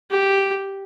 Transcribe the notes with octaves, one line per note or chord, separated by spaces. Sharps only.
G4